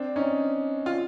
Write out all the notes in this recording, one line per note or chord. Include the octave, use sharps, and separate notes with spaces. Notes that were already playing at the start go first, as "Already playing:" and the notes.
Already playing: C4 D4
C#4 D#4
F4